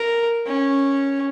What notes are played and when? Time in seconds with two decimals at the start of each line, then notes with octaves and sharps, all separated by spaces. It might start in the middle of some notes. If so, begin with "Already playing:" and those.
Already playing: A#4
0.47 C#4